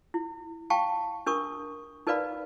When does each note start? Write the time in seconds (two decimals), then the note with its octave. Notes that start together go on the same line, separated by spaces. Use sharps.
0.14 E4
0.70 F5 G5 A5 C#6
1.26 D4 A#4 C#6 D#6
2.07 D#4 A#4 B4 D5 F5 B5